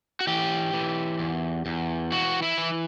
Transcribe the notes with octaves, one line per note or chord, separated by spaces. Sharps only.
F#4
E3 G4
E3
E2
E2
E3 F#4
E4
E3